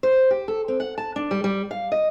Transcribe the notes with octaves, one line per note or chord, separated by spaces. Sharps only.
C5
G4
A4
C4
F#5
A5
D4
G3
G3
F5
D#5